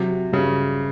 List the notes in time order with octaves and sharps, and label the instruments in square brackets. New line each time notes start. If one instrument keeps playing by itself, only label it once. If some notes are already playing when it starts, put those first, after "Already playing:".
Already playing: [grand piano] C3 [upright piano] F#3
[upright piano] G2 [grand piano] C#3